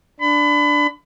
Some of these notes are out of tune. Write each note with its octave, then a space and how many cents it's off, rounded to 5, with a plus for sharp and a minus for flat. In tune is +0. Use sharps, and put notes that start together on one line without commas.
D4 +0 B5 +30